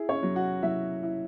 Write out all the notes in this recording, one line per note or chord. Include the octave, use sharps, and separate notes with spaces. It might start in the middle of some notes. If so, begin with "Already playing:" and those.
Already playing: E4 G#4
C#4 C#5
F#3
F#4 F#5
F#3 E4 E5
E4